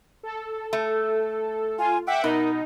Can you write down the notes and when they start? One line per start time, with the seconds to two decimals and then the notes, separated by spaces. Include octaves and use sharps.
0.23 A4
0.73 A3
1.78 F4 G#5
2.07 E5 F#5 G5 D6
2.24 B2 D#4 A#4